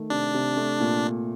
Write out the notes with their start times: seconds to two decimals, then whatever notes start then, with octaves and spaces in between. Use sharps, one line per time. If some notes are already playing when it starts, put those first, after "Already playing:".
Already playing: D#3 A3
0.10 C3 D4
0.34 C3
0.57 A3
0.80 A#2